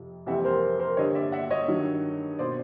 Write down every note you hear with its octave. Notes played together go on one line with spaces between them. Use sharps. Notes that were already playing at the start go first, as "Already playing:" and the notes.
Already playing: F2 C3 F3
F2 C3 E3 G3 C4 E5 F#5
A#4 C5
A#4 C5
G2 D3 G3 C#5 D#5
D5 E5
E5 F#5
C#5 D#5
G2 D#3 F#3
B2 C5 D5